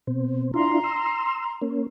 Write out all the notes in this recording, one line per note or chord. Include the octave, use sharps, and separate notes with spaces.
B2 C4
D4 E4 F4 A#5 C6
E6
A#3 C#4